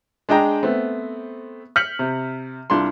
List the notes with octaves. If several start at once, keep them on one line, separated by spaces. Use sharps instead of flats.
G#3 D4 D#5 G5 A#5
A3 B3 C4
F6 G6 B6 C#7 F#7
C3
C2 D4 F4 C6